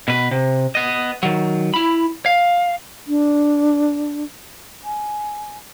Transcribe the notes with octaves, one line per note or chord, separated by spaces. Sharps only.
B2 B4
C3
B3 D#5
D#3 F#3
E4 B5
F5
D4
G#5